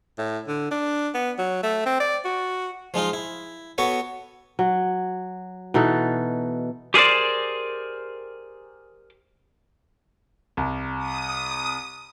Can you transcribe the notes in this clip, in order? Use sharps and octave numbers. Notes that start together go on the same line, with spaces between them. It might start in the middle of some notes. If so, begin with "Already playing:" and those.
A2
D3
D4
B3
F#3
A3
C4
D5
F#4
F3 G#3 D#4 F4
E4
B3 F#4 A4 B4 C#5
F#3
B2 E3 D#4 A4
G4 G#4 A#4 C5 D5
C2
D#6